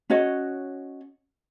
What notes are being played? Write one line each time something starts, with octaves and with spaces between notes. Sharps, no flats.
C#4 F#4 C#5 D#5